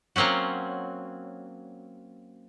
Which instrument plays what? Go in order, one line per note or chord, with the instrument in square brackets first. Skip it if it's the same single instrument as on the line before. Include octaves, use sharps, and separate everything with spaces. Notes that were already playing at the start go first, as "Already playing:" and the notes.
[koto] F#3 A#3 C4 C#4 F#4